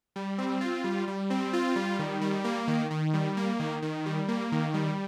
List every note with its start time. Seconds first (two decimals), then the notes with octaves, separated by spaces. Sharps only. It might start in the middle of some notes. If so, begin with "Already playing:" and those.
0.16 G3
0.38 C4
0.61 F4
0.84 G3
1.07 G3
1.30 C4
1.53 F4
1.76 G3
1.99 D#3
2.21 G3
2.44 A#3
2.68 D#3
2.91 D#3
3.14 G3
3.37 A#3
3.59 D#3
3.82 D#3
4.06 G3
4.28 A#3
4.52 D#3
4.74 G3